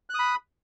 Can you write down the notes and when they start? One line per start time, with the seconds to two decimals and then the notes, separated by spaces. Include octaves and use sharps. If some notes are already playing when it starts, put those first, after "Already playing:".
0.10 F#6
0.14 D#6
0.19 B5